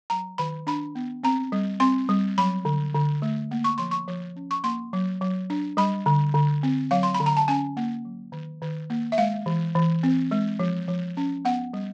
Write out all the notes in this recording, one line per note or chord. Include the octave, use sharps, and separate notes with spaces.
F#3 A#5
D#3 B5
D4 B5
B3
C4 A#5
G3
C4 C6
G3
F#3 B5
D3
D3
A3
A#3
C#6
F3 C6
C#6
F3
C#4
C#6
A#3 C6
F#3
F#3
D4
G3 B5
D3
D3
C4
F#3 F5
C6
B5
D3
A#5
A5
C#4 G#5
A#3
F#3
D#3
D#3
A#3
E5
G#3 F5
E3
E3
C4
G#3
F3
F3
C#4
B3 F#5
G3